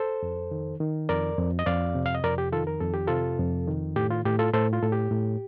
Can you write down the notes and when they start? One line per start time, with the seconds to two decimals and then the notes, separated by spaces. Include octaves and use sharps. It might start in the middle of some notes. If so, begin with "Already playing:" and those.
Already playing: A4 C5
0.23 F2
0.51 D#3
0.80 D#3
1.09 F2 A#4 D5
1.38 F2
1.59 D#5
1.66 F2 D5 F5
1.95 C3
2.06 F5
2.15 D#5
2.23 F2 A#4 D5
2.38 G4
2.52 D#3 F4 A4
2.67 A#4
2.80 F2 A4
2.94 G4
3.08 C3 F4 A4
3.39 F2
3.67 D#3
3.96 A2 G4
4.11 F4
4.25 A2 G4
4.39 F4 A4
4.53 A2 A4 C5
4.73 F4
4.82 A2 A4
4.92 G4
5.11 A2